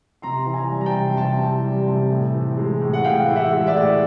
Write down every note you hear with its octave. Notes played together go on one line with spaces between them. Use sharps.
C3 A#5 C6
E3
G#5 A#5
G3
A#5
G5 A5
C3
C3 G5 A5
E3
G3
C3
A2
E3
G#3
A2
F#5
A2 F5 G5
E3
E5 F#5
G#3
D5 E5
A2